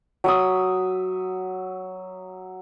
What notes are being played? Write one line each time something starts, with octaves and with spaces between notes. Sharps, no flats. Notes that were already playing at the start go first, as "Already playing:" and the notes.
F#3 E5 D#6